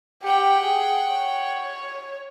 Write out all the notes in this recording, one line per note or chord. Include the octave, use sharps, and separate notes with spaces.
G4 F#5 G5
G#4
C#5